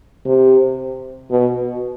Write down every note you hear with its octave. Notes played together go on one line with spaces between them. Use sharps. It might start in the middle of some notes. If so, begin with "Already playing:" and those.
C3
B2